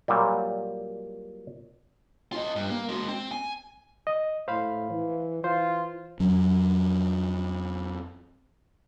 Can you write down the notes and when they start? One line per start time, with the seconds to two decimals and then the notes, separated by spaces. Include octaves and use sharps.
0.08 A#2 F#3 G3
2.33 F4 D#5
2.56 G2
2.70 A#3
2.89 G#3 F#4
3.08 C4
3.31 G#5
4.07 D#5
4.48 A2 C5 F5 B5
4.90 E3
5.44 E3 F4 C5
6.20 F2 F#3 C#4